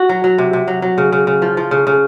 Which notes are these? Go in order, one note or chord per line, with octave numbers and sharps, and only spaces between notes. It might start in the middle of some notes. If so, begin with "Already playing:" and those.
Already playing: F#4
F#3
F#3
C3
C3
F#3
F#3
C#3
C#3
C#3
F3
F3
C#3
C#3